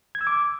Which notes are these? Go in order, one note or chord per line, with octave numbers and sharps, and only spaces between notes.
G#6
E6
D6